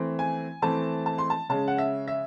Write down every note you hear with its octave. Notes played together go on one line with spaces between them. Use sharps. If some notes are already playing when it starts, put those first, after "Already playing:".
Already playing: E3 A3 C4
G#5
E3 A3 C4 A5
A5
C6
A5
C#3 G#3 C#4 A5
F#5
E5
E5